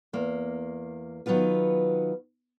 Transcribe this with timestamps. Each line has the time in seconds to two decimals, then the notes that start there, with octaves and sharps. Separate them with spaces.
0.13 E2 A#3
1.26 D#3 F#3 B3 F4 B4